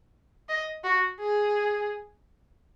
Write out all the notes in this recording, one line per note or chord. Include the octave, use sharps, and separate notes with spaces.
D#5
F#4
G#4